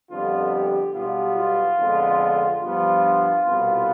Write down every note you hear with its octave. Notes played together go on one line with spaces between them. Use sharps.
F2 D3 G3 B3 F4
G4
B1 B2 G3 B3 F4
F4
F2 D3 G#3 B3
G2 F3 B3 F4
C2 B2 B3